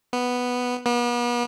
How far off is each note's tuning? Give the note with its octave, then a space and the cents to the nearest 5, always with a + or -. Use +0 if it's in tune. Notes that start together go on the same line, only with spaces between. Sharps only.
B3 +0
B3 -40